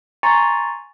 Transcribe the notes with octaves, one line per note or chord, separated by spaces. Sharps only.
G#5 A#5 C6 C#6 A6 C#7